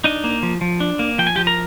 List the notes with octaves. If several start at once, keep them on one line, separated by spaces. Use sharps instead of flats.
D4 D#4 D#5
A#3
F3
F3
D4
A#3
F3 G5
G#5
F3 G4 G5
A#4 A#5